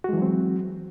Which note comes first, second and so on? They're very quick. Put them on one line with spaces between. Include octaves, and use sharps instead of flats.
F#4 G#3 E3 F#3 C4